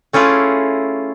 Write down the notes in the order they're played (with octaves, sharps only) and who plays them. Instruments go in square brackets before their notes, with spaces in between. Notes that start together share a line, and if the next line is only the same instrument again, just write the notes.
[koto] A3 C#4 E4 F4 G#4